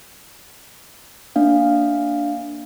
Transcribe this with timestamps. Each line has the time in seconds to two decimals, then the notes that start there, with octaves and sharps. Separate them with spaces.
1.36 A#3 D4 F5